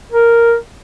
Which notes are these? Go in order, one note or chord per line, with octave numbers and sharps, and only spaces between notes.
A#4